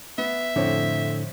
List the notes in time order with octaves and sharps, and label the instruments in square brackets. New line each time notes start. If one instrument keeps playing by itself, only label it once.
[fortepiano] B3 [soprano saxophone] E5
[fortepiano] F2 C4 C#5 [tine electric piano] A2 D3